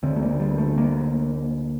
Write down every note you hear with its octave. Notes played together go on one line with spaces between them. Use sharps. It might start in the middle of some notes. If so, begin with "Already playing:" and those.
D2 D3 C4
A3
A#3
G3
A3
A#3